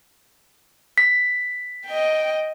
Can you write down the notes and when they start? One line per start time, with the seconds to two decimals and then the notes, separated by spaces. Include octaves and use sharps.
0.98 B6
1.86 D#5 G5